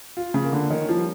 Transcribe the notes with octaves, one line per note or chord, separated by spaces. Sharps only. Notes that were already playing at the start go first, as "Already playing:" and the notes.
F4
C#3
A#3
D3
D#3 C#4
F3
G3